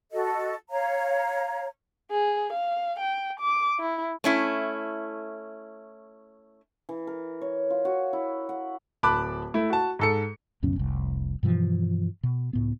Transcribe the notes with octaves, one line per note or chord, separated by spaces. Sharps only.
F#4 A4 D#5
C#5 F5 A#5
G#4
F5
G5
D6
E4
A3 C#4 E4
E3
A#4
C#5
F4
F#4
E4
F#5
D1 A5 B5 D6 F#6
A3 E4
F#4 A5
G#2 A4 C#7
C#2 F#2 B2 C#4
F1 C2
G2 B2 E3 F3
B2
C#2 A2 B3